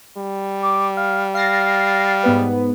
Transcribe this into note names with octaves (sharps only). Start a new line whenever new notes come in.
G3
D6
F5
F5 A6 A#6 C7
G#2 B3 B4